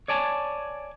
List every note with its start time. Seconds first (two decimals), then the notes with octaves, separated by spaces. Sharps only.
0.08 C#5 D5 G#5 A5